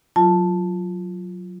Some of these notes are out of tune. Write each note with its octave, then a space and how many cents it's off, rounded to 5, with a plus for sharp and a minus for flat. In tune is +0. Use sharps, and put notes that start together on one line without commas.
F#3 -15 F4 -5 A5 +0